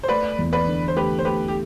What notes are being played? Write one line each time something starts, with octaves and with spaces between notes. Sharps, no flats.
C5
A3 B4 D5
E2
B4 D5
D3
C5
A3 G4 B4
C5
A3 G4 B4
G4